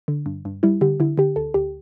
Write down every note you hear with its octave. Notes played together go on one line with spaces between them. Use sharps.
D3
G2
G2
G3 E4
D3 G4
D3 E4
D3 G4
D2 A4
D2 G4